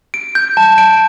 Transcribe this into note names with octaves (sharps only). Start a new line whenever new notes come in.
D7
G6
A5
D7